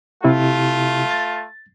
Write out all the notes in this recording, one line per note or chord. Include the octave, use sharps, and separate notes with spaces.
C3 A3 E4 F4 G4
A6